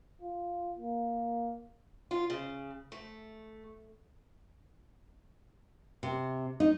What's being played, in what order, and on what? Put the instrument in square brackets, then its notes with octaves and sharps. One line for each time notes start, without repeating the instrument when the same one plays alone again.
[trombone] F4
A#3
[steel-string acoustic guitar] F4
C#3
A3
[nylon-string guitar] C3
D#4